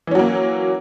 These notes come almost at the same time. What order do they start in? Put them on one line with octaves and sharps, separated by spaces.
E3 C#4 F#3 A#3